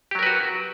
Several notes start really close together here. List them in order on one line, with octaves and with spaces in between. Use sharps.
G4 F#3 A#4 B4 F#4